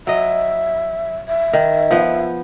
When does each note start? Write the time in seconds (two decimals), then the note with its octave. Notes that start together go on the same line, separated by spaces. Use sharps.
0.07 F#3 D#5 E5
1.28 E5
1.53 D#3
1.91 F3 B3